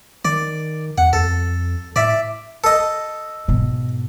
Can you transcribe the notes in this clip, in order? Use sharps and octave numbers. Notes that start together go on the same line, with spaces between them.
D#3 D5
E2 F#5
F2 A4
A2 D5 E5
A4 D#5
G#2 B2